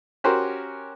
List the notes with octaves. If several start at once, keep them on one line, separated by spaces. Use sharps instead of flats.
C#4 F#4 G4 A#4 C5